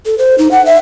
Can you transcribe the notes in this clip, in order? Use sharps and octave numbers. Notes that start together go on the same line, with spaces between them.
A4
C5
D#4
F#5
E5